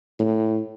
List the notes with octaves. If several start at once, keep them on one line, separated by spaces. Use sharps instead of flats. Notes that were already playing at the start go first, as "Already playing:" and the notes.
A2